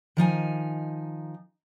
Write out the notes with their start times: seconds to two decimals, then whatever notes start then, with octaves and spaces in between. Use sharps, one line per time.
0.17 D#3 F3 D#4 G#5